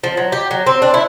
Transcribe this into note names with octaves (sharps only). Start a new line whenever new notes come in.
F3
F#3
G4
F#3
C4
D4
E4